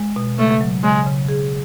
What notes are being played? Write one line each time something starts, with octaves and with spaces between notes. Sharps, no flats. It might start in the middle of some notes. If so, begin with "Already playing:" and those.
Already playing: G#3
B2
C#3 A3
F#3
C#3 G#3
C#3
G#4